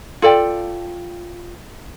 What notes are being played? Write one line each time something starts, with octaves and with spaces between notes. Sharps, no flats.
F4 A4 D5 G5